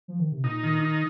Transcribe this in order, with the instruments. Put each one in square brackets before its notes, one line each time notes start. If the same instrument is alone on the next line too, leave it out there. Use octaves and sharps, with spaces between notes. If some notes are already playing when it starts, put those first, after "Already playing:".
[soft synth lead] F3
D#3
C3
[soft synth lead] A#2 [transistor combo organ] D#4
[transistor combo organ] D#3
D#4